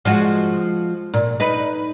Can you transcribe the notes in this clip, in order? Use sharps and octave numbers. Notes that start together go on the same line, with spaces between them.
F3 G#3 F#4
A#2
D#4 B4